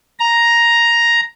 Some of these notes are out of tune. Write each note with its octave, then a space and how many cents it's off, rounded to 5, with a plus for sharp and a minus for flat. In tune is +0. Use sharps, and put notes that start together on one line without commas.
A#5 +5